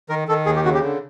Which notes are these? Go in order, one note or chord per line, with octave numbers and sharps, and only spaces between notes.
D#3 A#4
D#3 A4
D#2 G#4
G4
C#3 F#4
G4
D3